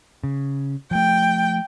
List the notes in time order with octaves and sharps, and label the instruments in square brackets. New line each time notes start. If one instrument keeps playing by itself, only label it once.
[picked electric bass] C#3
[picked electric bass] F3 A3 [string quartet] G5